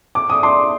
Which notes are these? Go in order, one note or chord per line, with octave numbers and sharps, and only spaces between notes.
D6
D#6
C6 D6